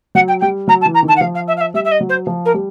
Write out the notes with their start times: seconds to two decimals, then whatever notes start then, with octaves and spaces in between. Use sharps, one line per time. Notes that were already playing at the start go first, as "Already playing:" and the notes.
0.15 F#3 F#5
0.28 G5
0.41 G3 G5
0.68 F#3 A#5
0.81 A5
0.86 E3
0.94 A#5
1.03 D#3
1.08 A5
1.16 F#5
1.20 F3 F5
1.35 F5
1.48 E5
1.57 F5
1.61 E5
1.74 G3 E5
1.85 E5
1.91 D#5
2.01 F#3
2.09 C5
2.27 F3
2.45 A#4
2.54 G3